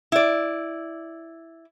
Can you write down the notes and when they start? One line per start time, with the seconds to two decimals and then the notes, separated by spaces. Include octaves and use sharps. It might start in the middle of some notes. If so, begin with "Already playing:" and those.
0.12 E4 D5